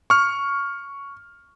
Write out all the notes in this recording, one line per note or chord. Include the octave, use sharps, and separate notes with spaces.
C#6 F6